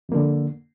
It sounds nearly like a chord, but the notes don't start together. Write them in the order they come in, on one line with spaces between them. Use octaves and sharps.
F2 A#3 D3